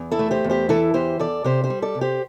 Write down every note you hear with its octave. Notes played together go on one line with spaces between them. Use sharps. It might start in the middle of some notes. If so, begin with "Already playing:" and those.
Already playing: E2
E4 A4
A3
G4 C5
E2
G4 C5
E3 E4 A4
E2 G4 C5
E2 A4 D5
C3 G4 C5
G4 C5
G3
A4 D5
C3
G4 C5